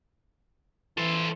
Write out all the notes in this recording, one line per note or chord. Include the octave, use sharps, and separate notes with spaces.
E3 A4 C5